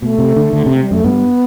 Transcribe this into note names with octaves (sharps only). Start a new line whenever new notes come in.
B2 A3
C3
D3
D3
C3
G3
F#2 A3
G2 B3